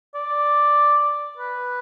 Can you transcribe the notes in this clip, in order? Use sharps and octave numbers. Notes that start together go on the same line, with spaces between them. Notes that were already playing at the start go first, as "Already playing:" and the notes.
D5
B4